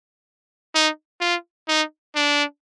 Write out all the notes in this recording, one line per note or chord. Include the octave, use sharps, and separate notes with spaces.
D#4
F4
D#4
D4